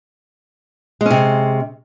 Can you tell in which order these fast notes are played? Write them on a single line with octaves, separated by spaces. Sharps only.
G#3 C#4 C3